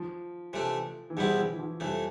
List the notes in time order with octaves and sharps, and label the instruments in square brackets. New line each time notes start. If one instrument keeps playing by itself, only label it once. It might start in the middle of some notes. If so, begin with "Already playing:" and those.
Already playing: [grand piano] F3
[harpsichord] C3 E3 A3 D4
[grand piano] E3
[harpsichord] E2 B2 G3 C4 E4 [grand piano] F3
[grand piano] E3
E3
F3
[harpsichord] F2 E3 A3 [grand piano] G3